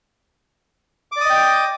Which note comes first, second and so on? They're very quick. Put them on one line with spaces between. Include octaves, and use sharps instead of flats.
D6 D5 D#6 D#5 G5